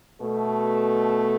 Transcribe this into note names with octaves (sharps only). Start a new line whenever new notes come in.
B2 A3